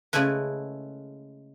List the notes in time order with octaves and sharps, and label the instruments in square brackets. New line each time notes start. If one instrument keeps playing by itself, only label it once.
[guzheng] C#3 G#3 A3 E4 B4